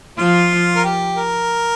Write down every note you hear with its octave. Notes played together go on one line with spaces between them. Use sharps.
F3 F4
A#4
G4
A#4